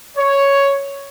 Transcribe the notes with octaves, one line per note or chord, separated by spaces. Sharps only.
C#5